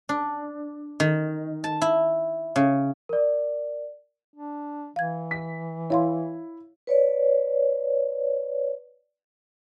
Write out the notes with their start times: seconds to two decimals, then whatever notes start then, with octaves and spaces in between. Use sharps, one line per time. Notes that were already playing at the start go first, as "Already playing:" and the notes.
0.09 D4
1.00 D#3
1.64 A5
1.82 E4
2.56 C#3
3.09 A#4 D5
4.34 D4
4.96 E3 F5 G#6
5.31 B6
5.90 E4 C#5 F5 C6
6.87 B4 C#5 D5